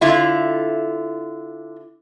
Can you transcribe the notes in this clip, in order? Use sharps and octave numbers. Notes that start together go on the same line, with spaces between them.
D3 E4 F4